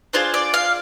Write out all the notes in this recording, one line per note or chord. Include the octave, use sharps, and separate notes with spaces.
D4 F4 G#4 C5
D5
F5